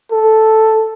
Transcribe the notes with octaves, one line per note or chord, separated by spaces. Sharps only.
A4